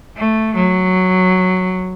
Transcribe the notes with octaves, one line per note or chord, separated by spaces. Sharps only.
A3
F#3